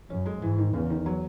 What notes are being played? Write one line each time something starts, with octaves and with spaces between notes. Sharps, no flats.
F#2 C#4
G#3
G#2 E3
D#3
E2 C#3
D#3
F#3